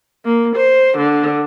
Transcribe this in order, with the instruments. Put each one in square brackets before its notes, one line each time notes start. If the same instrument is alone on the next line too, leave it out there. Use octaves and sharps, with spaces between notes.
[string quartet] A#3
C5
D3